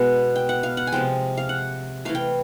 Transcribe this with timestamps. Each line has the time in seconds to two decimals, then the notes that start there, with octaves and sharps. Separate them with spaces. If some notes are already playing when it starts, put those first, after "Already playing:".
Already playing: B2 G#3 B3 F#5
0.36 G5
0.49 F#5
0.63 F5
0.77 F#5
0.87 G#5
0.92 C3 F3 G#3 G5
1.38 F5
1.49 F#5
2.05 E3 A3 F5
2.15 G5